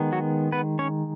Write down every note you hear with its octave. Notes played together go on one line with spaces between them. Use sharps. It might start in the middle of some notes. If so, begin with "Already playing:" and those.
Already playing: D#3 G#3 B3
F#3 F#4
B3 B4
C#4 C#5